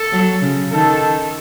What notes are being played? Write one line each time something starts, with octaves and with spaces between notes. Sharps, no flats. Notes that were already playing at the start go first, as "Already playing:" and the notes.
Already playing: A4
F#3
C#3
D#3 A4